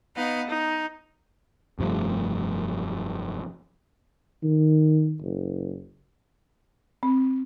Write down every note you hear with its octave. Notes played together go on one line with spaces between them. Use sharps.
B3 D#4 D#5 F5
D#4
F1 G2 F3 A3
D#3
F#1
C4